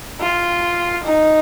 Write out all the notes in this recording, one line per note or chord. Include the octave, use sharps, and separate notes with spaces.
F4
D#4